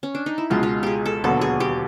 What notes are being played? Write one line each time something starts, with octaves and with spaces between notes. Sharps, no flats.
C#4
D4
D#4
E4
C#2 B2 G#3 F4
F4
G4 G#4
A4
E1 D#2 D3 F#3 B3 A4
G#4
G4